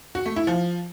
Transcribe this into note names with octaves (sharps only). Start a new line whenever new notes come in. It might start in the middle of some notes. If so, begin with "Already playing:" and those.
F#4
A3
E4
F3